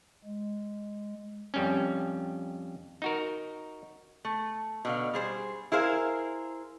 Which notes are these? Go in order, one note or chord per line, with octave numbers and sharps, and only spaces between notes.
G#3
F2 G3 C#4
D#4 F#4 A#4
A3
B2 D3 F5
G3 G#4 C5
E4 G#4 A#4 C5 F5